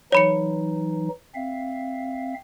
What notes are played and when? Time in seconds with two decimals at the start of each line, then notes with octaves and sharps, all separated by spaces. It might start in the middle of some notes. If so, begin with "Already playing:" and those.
0.12 E3 F#3 D#4 C#5 B5 C#7
1.35 C4 E5 F5